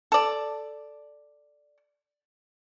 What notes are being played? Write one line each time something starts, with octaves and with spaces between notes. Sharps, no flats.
A4 D5